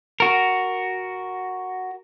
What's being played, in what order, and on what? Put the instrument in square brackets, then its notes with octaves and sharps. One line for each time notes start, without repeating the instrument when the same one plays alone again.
[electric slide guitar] F#4 A#4